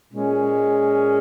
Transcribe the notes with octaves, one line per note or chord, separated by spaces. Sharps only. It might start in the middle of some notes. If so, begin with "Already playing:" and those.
A#2 G#3 C#4